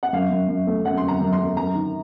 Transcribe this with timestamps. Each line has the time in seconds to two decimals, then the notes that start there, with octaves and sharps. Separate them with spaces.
0.03 F#5
0.13 F#2 F5
0.31 F#2
0.49 F#2
0.67 A3
0.85 F#2 F#5
0.97 C6
1.03 F#2
1.08 A#5
1.20 F#2
1.33 C6
1.39 F#2
1.57 F#2 A#5
1.75 D#3